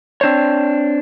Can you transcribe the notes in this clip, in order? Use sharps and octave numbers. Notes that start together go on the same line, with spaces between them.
C4 D4 C5 C#5